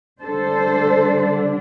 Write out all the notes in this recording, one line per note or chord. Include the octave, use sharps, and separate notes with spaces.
D3 G3 D4 A4 C5